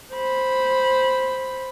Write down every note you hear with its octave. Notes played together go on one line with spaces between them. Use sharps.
C5 B5